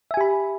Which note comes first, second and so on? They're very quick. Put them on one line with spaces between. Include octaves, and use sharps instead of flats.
E5 G#5 G4 B5